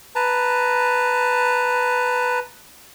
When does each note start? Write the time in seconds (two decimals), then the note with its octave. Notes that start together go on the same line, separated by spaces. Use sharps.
0.15 B4 A5 A#5